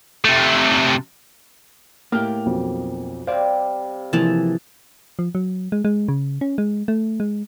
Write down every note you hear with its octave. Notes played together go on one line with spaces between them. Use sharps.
C3 A3
A2 A#3 G4 F6
B1 F2
C3 G3 C5 D5 F5
C3 E3 F3 A#3 G#4 A5
F3
F#3
G#3
G#3
C#3
C#4
G#3
A3
G#3